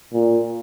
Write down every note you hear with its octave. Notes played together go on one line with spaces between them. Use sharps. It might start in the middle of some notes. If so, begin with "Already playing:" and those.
A#2